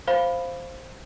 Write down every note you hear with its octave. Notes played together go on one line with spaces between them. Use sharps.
C5 F5 B5